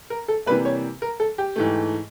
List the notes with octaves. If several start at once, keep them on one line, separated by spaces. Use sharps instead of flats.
A#4
A4
C3 E3 G3 A#3 B4
C#5
A#4
A4
G4
G#2 E3 A3